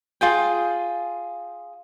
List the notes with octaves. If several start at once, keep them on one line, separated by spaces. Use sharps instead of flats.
F4 G#4 G5